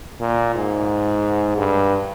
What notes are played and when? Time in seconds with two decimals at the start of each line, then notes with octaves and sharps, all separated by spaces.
0.20 A#2
0.55 G#2
1.58 G2